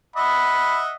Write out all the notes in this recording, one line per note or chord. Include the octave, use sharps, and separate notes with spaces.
D#5 E5 F#5 B5